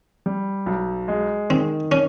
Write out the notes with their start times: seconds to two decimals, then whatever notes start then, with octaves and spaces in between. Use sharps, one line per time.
0.26 G3
0.66 B1
1.08 G#3
1.50 D#3 C4
1.92 C#4